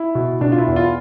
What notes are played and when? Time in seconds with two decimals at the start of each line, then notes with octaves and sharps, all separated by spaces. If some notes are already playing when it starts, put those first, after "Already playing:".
Already playing: E4
0.15 B2
0.41 B2 D4
0.52 F4
0.58 E4
0.67 E2
0.76 F4